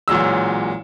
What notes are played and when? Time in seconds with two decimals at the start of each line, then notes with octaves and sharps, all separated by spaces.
0.08 A1 A#2 F#3 G#3 E6